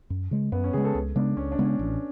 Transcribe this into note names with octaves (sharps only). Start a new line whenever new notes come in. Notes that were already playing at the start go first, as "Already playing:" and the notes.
F#2
C#3 G#3
F#2 B3
C#4
C#3 G#3 G#4
A4
C#2
C#3 G#3 B3 D4
C#2 C#4
D4
C#3 G#3 B3
C#4
A1